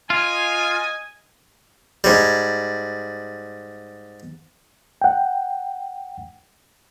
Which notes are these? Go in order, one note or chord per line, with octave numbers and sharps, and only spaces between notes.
F4 D#5 G#5
G#2 G3
F#5 G5